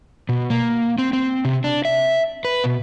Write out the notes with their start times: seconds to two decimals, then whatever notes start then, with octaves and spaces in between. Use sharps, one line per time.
0.29 B2
0.50 A#3
0.98 C4
1.13 C4
1.45 C3
1.64 D4
1.85 E5
2.45 B4
2.64 B2